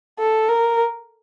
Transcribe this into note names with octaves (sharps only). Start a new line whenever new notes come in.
A4
A#4